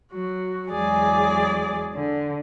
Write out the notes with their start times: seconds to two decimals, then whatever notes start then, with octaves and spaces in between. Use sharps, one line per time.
0.12 F#3 F#4
0.70 E2 F#3 G#3 G#4 D5 G#5
1.95 D3